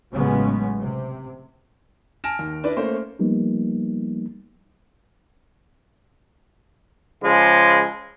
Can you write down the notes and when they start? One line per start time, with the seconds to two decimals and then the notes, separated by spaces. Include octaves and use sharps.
0.11 A1 C#3 F#3 G#3 B3 C#4
0.79 C3
2.24 G#5 A5 F6 A#6 D7 E7
2.39 D#2
2.64 D4 E4 B4 D5
2.76 A3 A#3 C#4 C5
3.19 F3 G3 A#3 B3 D#4
7.23 C#3 F3 G#3